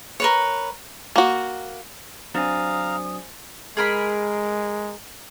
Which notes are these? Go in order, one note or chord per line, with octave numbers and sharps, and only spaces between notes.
A#4 B4 C#5
A#3 F#4
F#3 C4 D4 C5 F5 G#5 A#5 D#6
G#3 G#4 A#4 B5